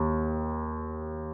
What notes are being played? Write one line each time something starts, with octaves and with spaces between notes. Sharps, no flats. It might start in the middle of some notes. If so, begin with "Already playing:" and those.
Already playing: D#2